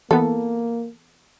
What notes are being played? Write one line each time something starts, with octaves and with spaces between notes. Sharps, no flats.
E3 A#3 B3 A4